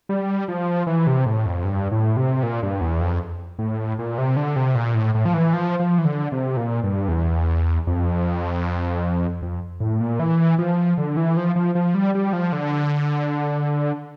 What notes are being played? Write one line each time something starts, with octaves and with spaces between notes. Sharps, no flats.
G3
F3
E3
C3
A2
F2
G2
A2
C3
A#2
G2
E2
F2
A2
A#2
C3
D3
C3
A#2
A2
A2
F3
E3
F3
F3
E3
D3
C3
A#2
G2
E2
F2
F2
A2
A#2
E3
F3
D3
E3
F3
F3
F3
G3
G3
F3
D3